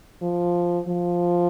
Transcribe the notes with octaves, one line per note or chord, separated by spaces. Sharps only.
F3
F3